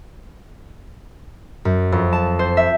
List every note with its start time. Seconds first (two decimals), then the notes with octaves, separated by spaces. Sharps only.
1.65 F#2
1.92 F2
2.13 A5
2.39 C5
2.57 E5